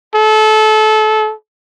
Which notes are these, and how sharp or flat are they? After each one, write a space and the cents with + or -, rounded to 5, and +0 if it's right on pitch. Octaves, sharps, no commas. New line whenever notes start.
A4 -25